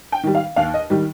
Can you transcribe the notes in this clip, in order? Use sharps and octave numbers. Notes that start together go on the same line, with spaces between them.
G5
D#3 G3
F5
D#2 F5
D#5
D#3 G3